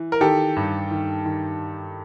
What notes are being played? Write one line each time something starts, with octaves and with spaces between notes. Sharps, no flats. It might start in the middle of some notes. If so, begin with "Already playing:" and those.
Already playing: E3
A#4
D#3 G4 A4
G2
D#3
D#3